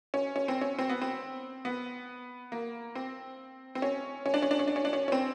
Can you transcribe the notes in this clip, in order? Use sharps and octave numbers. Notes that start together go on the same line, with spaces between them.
C#4
C#4
C4
C#4
C4
B3
C4
B3
A#3
C4
C4
C#4
C#4
D4
C#4
D4
C#4
D4
C#4
D4
C#4
C#4
C4